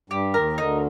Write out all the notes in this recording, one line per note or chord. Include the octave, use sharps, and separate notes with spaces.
G2 G3 G4
D#2 D#3 A#4
D2 D3 D#4